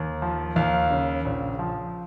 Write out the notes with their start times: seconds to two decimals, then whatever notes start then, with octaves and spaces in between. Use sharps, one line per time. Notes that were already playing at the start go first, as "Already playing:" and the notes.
Already playing: D#2
0.22 F3
0.56 D#2 F5
0.91 C#3
1.25 A#1
1.59 F3